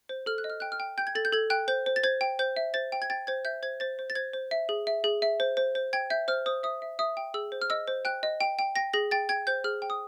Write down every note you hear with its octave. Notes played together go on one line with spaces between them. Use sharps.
C5
A4 F6
F#6
D#5
F6
G5 F#6
F6
G5
G5 G6
G#6
A4 A6
G6
A4 G#6
G5 F#6
C5 G6
C5
A6
C5 G#6
G5
C5 G6
E5
C5 A6
G5
G#6
G5 A6
C5 G#6
E5 G6
C5 G#6
C5 A6
C5
A6
C5 G#6
C5
E5
G#4
E5
G#4
E5
C5
C5
C5
G5 G#6
E5 G6
C5 F6
C5 D#6
E5 D#6
E5
E5 D#6
G5
G#4 E6
C5
F6
D#5 E6
C5
G5 F#6
D#5
G5
G5
G5 A#6
G#4 A#6
G5 A6
G5 G#6
C5 G6
G#4 F6
G5
D#6